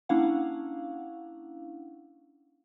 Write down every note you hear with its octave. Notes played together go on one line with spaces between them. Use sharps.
A#3 C#4 D4 E4 F5 F#5